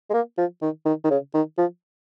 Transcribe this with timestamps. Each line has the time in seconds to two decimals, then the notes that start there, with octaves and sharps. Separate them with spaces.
0.10 G#3
0.14 A#3
0.38 F3
0.62 D#3
0.86 D#3
1.04 D#3
1.10 C#3
1.34 D#3
1.58 F3